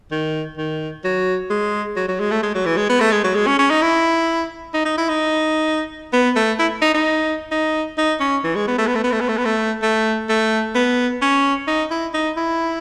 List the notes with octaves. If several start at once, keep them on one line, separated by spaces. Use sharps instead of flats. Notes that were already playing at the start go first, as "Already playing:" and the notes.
D#3
D#3
F#3
G#3
F#3
F#3
G#3
A3
G#3
F#3
E3
G#3
B3
A3
G#3
F#3
G#3
C#4
C#4
D#4
E4
D#4
D#4
E4
D#4
B3
A3
E4
D#4
D#4
D#4
D#4
C#4
E3
G#3
B3
A3
B3
A3
B3
A3
B3
A3
B3
A3
A3
A3
B3
C#4
D#4
E4
D#4
E4